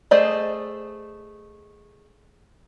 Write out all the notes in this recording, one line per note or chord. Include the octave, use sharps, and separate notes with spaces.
A3 G#4 C5 D5 D#5